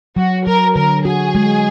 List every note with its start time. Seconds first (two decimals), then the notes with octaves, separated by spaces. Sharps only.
0.16 F#3 F#4
0.46 F#3 A#4
0.76 D3 A#4
1.05 F#4 G#4
1.35 G#3